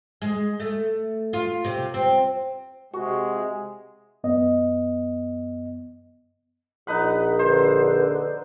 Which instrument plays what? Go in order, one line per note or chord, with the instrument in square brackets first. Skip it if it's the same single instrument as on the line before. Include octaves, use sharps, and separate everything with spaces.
[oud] G#3
A3
F4
C3
C4
[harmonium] C3 [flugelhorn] G#3 [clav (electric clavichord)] F#4
[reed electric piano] F#2 B3 D#5
[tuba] A#1 [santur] D#4 B4 F#5
[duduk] D3 [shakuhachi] B4 [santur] C5